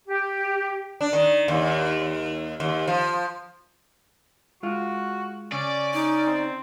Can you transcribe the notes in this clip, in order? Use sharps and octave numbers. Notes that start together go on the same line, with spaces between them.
G4
D4
D#3
D#2
D#2
F3
G#3 F4 F#4
C#3 C#4 D5
D#4
C4